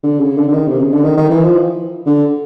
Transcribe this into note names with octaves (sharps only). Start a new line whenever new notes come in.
D3
C#3
D3
D3
D#3
C3
C#3
D3
D#3
D#3
E3
F3
D3